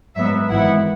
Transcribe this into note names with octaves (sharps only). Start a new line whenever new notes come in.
G#2 F#3 B3 E5
G#1 G#2 E3 B3 E4 F#5